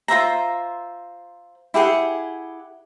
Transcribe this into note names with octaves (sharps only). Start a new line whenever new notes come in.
F4 C5 E5 A#5
E4 G4 G#4 F#5